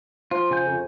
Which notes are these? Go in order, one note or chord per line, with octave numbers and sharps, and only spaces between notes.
F3 F4
C#3 G#5 G6
F2